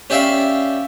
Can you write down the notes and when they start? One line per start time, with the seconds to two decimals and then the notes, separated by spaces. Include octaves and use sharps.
0.10 C#4 G4 D5 E5 F5 G5